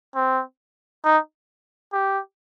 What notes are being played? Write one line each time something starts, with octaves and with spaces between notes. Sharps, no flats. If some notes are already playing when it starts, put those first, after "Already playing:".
C4
D#4
G4